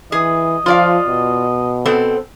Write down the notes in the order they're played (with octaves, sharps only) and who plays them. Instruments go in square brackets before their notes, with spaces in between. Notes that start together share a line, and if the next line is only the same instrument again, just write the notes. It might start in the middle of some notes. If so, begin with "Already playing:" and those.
[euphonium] E3 [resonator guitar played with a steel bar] G#4 [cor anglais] D#5
[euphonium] F3 [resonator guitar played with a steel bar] F4 D5 F5
[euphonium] B2
[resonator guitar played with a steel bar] B3 C4 A4